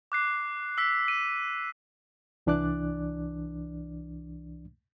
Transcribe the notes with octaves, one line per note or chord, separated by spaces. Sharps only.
D6 F#6 C7
E6 B6
D#7
C2 E3 D4 D5 D6 F#6